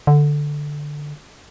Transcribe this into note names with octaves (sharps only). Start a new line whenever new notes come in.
D3